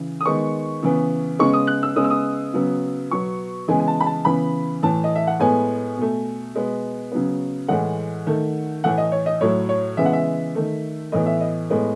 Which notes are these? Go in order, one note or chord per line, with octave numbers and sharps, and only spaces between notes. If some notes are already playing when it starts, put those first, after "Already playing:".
Already playing: C#3 E3
D#6
D#3 G#3 B3 C#6
C#3 E3 B3
C#3 G#3 B3 C#6
D#6
F#6
E6
C#3 G#3 B3 D#6
E6
D#6
C#3 F#3 B3
B2 F#3 B3 C#6
C#3 E3 G#3 B3 G#5
G#5
A5
B5
A5
C#3 E3 B3 B5
A2 E3 A3 A5
D#5
E5
F#5
A2 G#3 B3 G#5
B2 A3
B2 G#3 B3
C#3 F#3 B3
A2 E3 G#3 F#5
D#3 A3
A2 E3 A3 F#5
D#5
C#5
D#5
A2 F#3 A3 C#5
C#5
C#3 E3 G#3 B3 E5
F#5
E5
D#3 A3
A2 E3 B3 D#5
E5
D#5
A2 G#3 B3